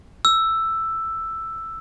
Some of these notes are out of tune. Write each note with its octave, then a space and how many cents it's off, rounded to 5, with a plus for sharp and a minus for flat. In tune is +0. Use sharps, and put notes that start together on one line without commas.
E6 +5